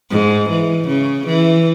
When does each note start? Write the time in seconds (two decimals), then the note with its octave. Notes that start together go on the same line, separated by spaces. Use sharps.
0.11 G#2
0.50 E3
0.87 C#3
1.27 E3